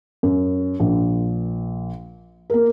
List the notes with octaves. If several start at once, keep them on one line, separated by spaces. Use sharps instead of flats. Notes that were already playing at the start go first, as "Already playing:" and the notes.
F#2
A#1
A#3 A#4